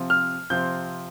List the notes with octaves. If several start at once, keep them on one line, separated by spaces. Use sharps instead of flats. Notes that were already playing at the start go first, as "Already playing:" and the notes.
Already playing: C3 F3 C4
F6
C3 F3 C4 G6